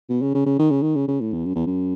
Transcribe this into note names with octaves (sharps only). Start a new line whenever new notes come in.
B2
C#3
C#3
C#3
D#3
C#3
D#3
C#3
C#3
A2
E2
F#2
E2
F#2